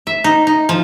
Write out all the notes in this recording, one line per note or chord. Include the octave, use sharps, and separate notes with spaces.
E5
D#4
D#4
F3